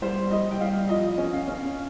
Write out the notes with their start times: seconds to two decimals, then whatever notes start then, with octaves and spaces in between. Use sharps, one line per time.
0.02 G3 C5
0.31 G3 D#5
0.51 G5
0.61 G3 F5
0.89 F3 D#5
1.18 C#4
1.33 F5
1.48 C#4